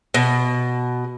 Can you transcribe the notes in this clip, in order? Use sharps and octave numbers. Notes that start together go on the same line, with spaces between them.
B2